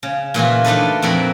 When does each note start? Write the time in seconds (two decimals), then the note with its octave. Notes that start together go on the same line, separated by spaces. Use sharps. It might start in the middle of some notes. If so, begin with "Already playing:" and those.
0.03 C#3
0.34 A#2 E3 F4 F#4
0.64 A3 D4 D#4 A4 B4
1.02 F2 A#2 C4 F#4 A#4 B5